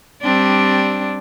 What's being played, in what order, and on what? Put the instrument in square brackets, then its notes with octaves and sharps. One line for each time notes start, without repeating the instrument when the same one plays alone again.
[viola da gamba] G3 C4 D4